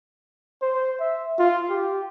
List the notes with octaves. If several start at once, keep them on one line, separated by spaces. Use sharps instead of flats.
C5
E5
F4
G4